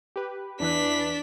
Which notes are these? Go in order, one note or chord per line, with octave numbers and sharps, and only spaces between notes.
G4 B4
E2 E3 D4 B4 B6